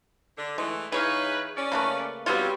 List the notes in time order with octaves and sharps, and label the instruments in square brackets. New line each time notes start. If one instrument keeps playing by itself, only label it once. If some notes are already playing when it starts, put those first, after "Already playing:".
[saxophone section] D3
[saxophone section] E3 A3 [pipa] G#3
[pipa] E3 [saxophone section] D#4 B4 [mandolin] G#4 C#5 F5
[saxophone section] C#4 D5
[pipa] C#3 A3 A#3 [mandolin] B4 B5
[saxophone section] G3 [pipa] B3 F4 [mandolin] C4 F#4 C#5